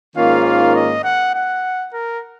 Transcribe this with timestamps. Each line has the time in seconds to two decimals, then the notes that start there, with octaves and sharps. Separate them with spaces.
0.16 G#2 D#3 A#3 C#4 F4 F5
0.45 F5
0.75 D#5
1.04 F#5
1.34 F#5
1.93 A#4